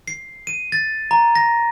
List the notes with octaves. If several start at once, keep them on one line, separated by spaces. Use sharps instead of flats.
C7
D#7
A6
A#5
A#6